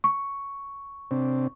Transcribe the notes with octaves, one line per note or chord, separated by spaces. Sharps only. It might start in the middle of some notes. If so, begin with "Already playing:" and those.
C#6
C3 C4 D4